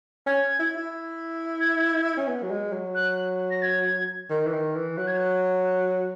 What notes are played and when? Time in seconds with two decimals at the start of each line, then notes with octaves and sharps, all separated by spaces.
0.26 C#4 G#6
0.59 E4
0.77 E4
1.60 G#6
2.17 C#4
2.27 B3
2.43 F#3
2.51 G#3
2.73 F#3
2.95 F#6
3.50 A#6
3.62 G#6
4.30 D#3
4.46 E3
4.53 D#3
4.75 E3
4.97 F#3 F#6
5.07 G#6
5.17 F#6
5.65 F#6